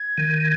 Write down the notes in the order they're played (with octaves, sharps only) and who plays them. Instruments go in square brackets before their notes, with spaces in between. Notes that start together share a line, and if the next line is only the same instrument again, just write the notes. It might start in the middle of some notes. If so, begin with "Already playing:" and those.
Already playing: [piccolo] G#6
[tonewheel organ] D#3